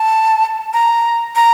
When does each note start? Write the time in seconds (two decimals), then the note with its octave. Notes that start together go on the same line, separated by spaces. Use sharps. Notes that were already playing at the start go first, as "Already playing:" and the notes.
Already playing: A5
0.73 A#5
1.36 A#5